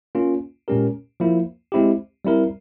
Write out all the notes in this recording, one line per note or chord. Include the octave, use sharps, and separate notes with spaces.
A#3 C#4 F4
A#2 G#3 C#4 G4 A#4
F3 A#3 E4
G#3 C4 E4 G4
G3 C4 E4 A#4